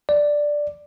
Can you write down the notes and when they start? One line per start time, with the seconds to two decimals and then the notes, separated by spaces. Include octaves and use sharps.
0.09 D5